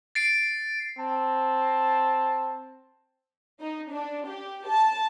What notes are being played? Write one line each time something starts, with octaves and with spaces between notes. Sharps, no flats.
A6 C7 D7
C4 A5
D#4
D4
G4
A5